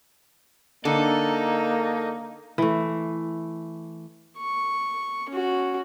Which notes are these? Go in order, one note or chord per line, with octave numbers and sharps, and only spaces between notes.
D3 A#3 D#4 A4
E3 A3
C#6
C#4 F#4